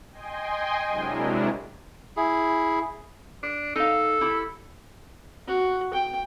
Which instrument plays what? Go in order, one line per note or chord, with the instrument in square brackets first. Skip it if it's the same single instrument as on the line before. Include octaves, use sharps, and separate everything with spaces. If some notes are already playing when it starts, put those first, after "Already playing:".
[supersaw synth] D#5 G5 G#5 C6
C3 F#3 G#3 D4 E4 A#4
[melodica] E4 G#4
[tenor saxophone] D4
[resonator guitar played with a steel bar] D#4 F5 [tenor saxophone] A4
[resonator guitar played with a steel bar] E4 G4
[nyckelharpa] F#4
G5